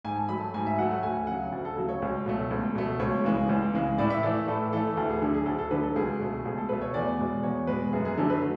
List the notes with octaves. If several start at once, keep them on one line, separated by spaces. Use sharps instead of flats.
G#2 G#5
A5
F#3 A3 B5
A5
G#2 G#5
E5
F#3 A3 F#5
F#5
D2 G#5
C#3 F#3 F#5
D2
A4
C#3 F#3
C#5
C#2
B2 F#3 A3
C#2
B2 F#3 A3
C#2 C#5
C#3 E3 G#3
C#2
C#3 E3 G#3
A2 D5
E5
E3 A3 D5
A2 A4
E3 A3 A4
D2 A4
G#4
D3 F#3 A4
G#4
D2 A4
A4
D3 F#3 B4
A4
C#2 G#4
B2 A3
C#2 G#4
A4
B2 A3 B4
C#5
E2 D5
B2 G#3
E2 C#5
B2 G#3 B4
F#2 G#4
G#4
D3 F#3 A3 A4
B4